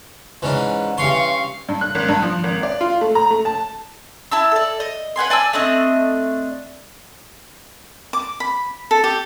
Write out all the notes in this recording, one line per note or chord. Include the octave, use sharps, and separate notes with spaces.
G#2 E3 C#4 D4
G2 E3 C#4 F5 C6 C#6
G2
F#6
G#1
G2
F3
G#1
D5
F4
A3
A#5
A3
A5
E4 A5 E6
A4 D5
D#5
B4 F#5 G#5 C6
D5 G#5 A5 E6
A3 C4 D4 D#5
D6
B5
A4
G4